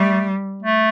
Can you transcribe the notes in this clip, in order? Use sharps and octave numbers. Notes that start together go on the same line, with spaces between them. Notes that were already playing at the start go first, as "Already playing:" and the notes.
Already playing: G3 A3
A3